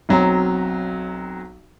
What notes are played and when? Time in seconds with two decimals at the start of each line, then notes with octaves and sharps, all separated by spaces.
0.09 B1 F#3 C4 A#5